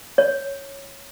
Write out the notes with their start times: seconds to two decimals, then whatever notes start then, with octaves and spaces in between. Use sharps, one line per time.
0.18 C#5